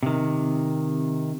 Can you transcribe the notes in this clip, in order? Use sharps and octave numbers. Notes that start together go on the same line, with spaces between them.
C3 D#3